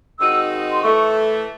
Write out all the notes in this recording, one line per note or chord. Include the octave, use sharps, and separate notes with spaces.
D#3 G#3 C4 D#4 F#4 E6
C6
A2 E3 A3 C#6